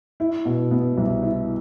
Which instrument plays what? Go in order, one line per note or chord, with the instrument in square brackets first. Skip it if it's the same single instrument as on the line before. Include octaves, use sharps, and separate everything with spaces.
[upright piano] E4
B2
B3
C2
E4